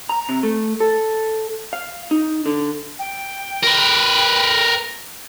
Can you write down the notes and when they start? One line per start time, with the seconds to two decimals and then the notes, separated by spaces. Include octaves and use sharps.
0.09 A#5
0.29 C3
0.43 A3
0.80 A4
1.73 F5
2.11 D#4
2.46 D3
2.99 G5
3.63 A#4 B4